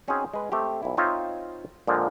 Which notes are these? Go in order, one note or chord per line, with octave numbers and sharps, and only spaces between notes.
C4 C#4 D#4 F#4 G#4 C5
G#3 B4
A3 C4 G4
B1 E4
C4 D#4 F4 C#5 E5 F5
A#2 D3 F3 G#3